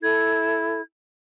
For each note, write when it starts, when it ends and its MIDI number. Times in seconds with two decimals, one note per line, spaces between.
0.02 0.80 64
0.02 0.80 69
0.02 0.80 92